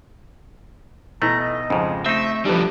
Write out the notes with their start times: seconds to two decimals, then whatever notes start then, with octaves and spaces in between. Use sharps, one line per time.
1.22 B2 E3 A3 A#5
1.40 D#5
1.70 F2 G#2 C#3 F3
2.06 A3 C4 D#4 E5
2.45 F3 G3 D4 G4 A4 B4